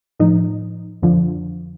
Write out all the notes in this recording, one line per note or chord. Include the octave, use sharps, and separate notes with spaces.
A2 F3 D#4
F2 D3 F3